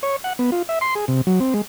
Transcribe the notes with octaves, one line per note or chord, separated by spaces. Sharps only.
C#5
F#5
B3
F4
E5
C6
G#4
C3
F#3
C4
G#3